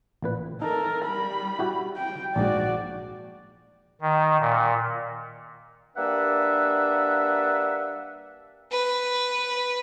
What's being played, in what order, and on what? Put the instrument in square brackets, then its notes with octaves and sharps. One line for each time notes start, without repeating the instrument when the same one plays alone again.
[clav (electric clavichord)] A1 A#2 B4
[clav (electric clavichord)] D#4 [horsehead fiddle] A4 A#4
[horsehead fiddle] G3 B5
[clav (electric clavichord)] E4 F#4 G4
[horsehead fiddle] G5
[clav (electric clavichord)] A#1 G#2 [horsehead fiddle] F#4 D5
[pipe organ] D#3
A#2
[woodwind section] G3 A#3 D4 B4 E5 F#5
[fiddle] B4